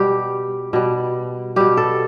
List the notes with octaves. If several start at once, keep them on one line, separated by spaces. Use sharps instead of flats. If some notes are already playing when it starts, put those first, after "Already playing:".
Already playing: B2 G3 G4
B2 G3
B2 G3 G4
A4